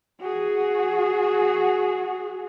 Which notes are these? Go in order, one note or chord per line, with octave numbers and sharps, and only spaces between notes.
F#4 G#4